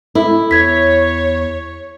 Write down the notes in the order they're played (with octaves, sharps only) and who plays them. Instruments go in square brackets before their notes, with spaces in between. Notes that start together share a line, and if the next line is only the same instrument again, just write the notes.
[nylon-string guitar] E4 [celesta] A4
[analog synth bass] E2 [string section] C#5 [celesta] G#6 B6